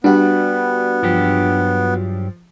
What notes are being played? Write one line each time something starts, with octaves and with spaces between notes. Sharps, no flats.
G3 B3 D4 F#4
G2 F3 F#3 G4